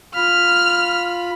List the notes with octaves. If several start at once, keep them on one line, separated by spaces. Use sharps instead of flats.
F4 B5 F6